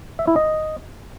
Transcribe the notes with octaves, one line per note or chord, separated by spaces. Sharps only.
E5
E4
D#5